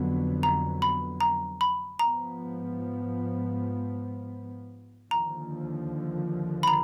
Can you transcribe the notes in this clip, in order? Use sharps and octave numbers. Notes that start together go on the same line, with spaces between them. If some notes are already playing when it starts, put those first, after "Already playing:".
Already playing: F2 D3 F#3 B3
A#5
B5
A#5
B5
G#2 F3 B3 A#5
D#2 D3 F3 A#5
B5
A#5